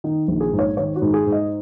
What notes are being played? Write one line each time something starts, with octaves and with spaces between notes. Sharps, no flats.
D#3 D#4
A#1
G#4
G#2
C#5
D#3 C#5
F#4
G#2
G#4
G#2
D#5